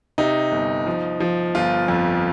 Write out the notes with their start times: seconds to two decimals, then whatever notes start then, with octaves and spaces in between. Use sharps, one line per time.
0.18 C3 D#4
0.52 G1
0.87 F3
1.20 F3
1.55 G1 F4
1.88 F2